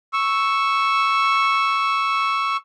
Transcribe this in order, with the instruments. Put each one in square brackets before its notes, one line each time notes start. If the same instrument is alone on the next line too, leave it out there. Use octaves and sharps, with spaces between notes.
[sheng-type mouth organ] C#6 E6